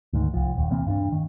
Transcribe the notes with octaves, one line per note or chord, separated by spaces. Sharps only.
D2 G#2 D#3
C2 F3
D#1 D#2
C3 E3 A#3 C4
G2 C#4 D4
D#3